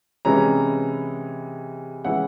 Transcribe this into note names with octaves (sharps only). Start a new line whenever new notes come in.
C3 E3 G#3 C#4 E4 A#5
E3 G#3 C#4 E4 F#5